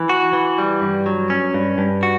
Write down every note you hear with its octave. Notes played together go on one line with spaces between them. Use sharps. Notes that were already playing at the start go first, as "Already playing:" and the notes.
Already playing: E3
F#4
E3
G3
G2
F#3
C#4
G2
G2
F#4